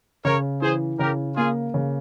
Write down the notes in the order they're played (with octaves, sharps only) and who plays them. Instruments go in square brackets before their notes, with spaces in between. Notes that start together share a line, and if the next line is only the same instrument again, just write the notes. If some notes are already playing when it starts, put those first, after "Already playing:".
[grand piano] C#3 [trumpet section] A#4 C#5
[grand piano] E3 [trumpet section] G#4 C5
[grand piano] C#3 [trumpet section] G4 A#4
[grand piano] A#3 [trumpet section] F4 G#4
[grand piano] C#3